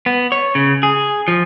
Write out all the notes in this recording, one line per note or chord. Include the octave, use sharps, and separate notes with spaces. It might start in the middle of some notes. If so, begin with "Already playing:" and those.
B3
C#5
C#3
G#4
F3